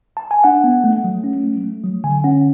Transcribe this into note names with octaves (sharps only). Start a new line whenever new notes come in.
A5
G#5
D4 F#5
B3
A3
F#3
C#4
A3
A3
F#3
D3 G#5
C#4 F#5